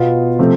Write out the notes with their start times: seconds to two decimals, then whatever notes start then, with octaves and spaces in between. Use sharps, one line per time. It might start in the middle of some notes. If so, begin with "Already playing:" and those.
Already playing: B2 B3 F4
0.39 C3 F3 A3 C4